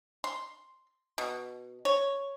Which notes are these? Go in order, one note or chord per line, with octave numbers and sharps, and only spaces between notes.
C6
B2
C#5